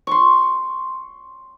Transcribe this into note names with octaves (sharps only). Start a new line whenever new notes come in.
C6 C#6